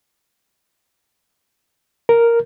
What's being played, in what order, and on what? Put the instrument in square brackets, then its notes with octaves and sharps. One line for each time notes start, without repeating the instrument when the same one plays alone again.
[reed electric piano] A#4